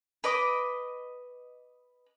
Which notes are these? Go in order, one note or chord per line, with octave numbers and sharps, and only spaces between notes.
B4 D#5 D6